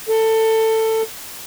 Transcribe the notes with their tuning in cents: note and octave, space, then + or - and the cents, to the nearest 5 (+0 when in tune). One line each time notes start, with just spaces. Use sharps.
A4 +20